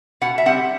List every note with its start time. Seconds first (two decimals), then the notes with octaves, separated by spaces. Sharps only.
0.21 B2 F#5
0.38 E5
0.46 G3 C4 F#5